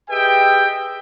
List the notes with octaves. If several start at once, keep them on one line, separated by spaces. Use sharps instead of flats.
G4 G#4 B4 D#5 E5 G5